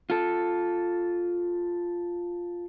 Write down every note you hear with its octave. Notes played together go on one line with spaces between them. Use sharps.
F4 A4